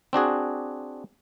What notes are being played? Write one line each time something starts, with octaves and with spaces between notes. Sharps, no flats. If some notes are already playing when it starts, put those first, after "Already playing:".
C4 D4 F#4 G#4